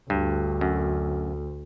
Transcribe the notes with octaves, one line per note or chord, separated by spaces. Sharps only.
D2 G2
F#2